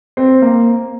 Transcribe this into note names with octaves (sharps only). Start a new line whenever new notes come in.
C4
A#3